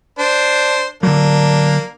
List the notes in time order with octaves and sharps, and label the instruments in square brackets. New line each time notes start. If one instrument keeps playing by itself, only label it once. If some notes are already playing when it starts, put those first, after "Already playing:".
[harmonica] D4 C5
[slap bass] D3 F#3 [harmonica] A#3 D4